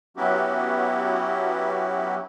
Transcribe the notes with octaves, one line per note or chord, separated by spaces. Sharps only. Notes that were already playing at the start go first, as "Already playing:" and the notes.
F#3 B3 C#4 E4 F#4 G4